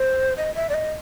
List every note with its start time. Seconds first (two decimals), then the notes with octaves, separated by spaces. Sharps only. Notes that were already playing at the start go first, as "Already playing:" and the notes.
Already playing: C5
0.37 D#5
0.55 E5
0.69 D5
0.74 D#5